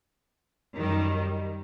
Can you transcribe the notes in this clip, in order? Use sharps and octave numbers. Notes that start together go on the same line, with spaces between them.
F#2 D#3 G3